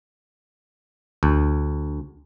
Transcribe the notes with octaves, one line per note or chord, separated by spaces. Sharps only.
D2